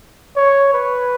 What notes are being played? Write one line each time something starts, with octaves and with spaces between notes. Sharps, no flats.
C#5
B4